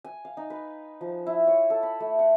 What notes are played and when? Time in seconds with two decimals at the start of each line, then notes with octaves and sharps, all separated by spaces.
0.04 G#5
0.25 F5
0.37 D#4
0.50 B4
1.01 F3
1.27 E4
1.47 C#5
1.70 A4
1.83 B5
2.00 A3
2.19 F#5